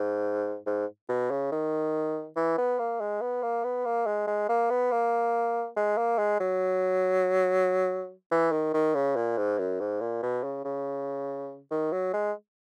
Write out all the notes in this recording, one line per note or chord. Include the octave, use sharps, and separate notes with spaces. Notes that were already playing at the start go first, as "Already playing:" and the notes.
Already playing: G#2
G#2
B2
C#3
D#3
E3
B3
A#3
G#3
B3
A#3
B3
A#3
G#3
G#3
A#3
B3
A#3
G#3
A#3
G#3
F#3
E3
D#3
D#3
C#3
A#2
G#2
F#2
G#2
A#2
B2
C#3
C#3
D#3
F#3
G#3